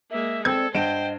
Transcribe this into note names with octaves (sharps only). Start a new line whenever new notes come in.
G#3 A#3 E5
C4 A4 C5 D5 E6 G#6
G2 C5 D#5 F#5 G5 D7 E7